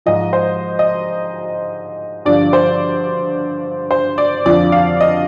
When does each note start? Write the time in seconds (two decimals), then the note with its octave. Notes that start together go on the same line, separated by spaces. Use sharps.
0.06 G#2 F3 D#5
0.33 C5
0.79 D#5
2.25 G2 D3 F3 D5
2.53 C5
3.91 C5
4.18 D5
4.46 F2 D3 F3 D5
4.72 F5
5.01 D#5